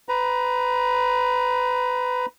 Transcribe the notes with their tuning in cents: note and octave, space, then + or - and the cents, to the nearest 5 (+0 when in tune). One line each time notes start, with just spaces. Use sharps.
B4 +25 A#5 +30